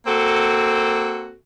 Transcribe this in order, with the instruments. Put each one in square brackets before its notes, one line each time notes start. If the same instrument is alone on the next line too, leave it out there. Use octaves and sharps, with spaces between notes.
[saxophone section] A#3 C4 F#4 A4